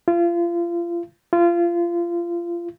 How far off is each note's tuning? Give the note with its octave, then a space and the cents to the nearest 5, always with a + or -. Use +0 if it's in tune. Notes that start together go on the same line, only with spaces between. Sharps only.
F4 -30
F4 -25